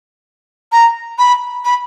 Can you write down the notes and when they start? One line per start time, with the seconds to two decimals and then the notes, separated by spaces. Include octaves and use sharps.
0.72 A#5
1.18 B5
1.65 B5